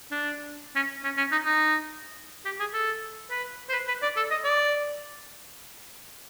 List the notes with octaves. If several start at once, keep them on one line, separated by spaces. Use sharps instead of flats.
D4
C#4
C#4
C#4
D#4
D#4
G4
G#4
A4
B4
C5
B4
B4
D5
A4
D#5
D5